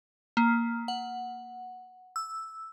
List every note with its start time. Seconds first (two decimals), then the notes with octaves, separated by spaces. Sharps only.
0.37 A#3
0.88 F#5
2.16 E6